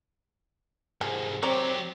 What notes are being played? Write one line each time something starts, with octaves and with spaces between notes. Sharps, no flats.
C2 G#2 F3 G#5
F#3 C4 G4 C#5 D5 A#5